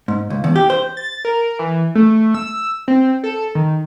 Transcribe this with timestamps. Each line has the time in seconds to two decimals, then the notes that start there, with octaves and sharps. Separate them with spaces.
0.08 G#2
0.30 C#2
0.44 E2
0.56 G4
0.70 C5
0.97 A6
1.25 A#4
1.59 E3
1.95 A3
2.34 E6
2.88 C4
3.24 A4
3.55 D#3